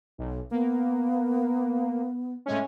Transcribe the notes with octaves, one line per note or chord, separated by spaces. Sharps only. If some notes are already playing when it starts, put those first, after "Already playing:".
B1
A#3 B3
A2 G#3 C#4